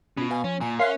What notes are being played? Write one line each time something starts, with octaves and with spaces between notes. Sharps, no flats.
B2 C#4 F4
B4 F5 G#5
F3 C#4
A#2 G#5
C#4 A#4 E5 F5 C6 F#6